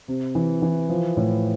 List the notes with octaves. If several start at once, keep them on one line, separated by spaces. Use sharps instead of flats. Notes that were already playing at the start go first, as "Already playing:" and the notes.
C3
E3
E3
F3
A2